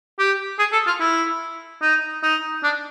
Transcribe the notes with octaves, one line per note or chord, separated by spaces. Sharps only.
G4
G#4
A4
F4
E4
D#4
D#4
D4